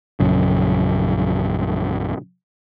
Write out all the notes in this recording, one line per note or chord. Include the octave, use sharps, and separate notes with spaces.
A#1 F#2 C#3